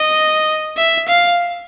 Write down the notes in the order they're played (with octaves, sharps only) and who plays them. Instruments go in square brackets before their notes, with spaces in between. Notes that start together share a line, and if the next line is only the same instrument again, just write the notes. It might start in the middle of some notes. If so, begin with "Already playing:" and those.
Already playing: [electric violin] D#5
E5
F5